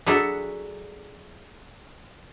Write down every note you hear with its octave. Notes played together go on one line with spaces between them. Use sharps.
F#3 D4 E4 F#4 G#4 A4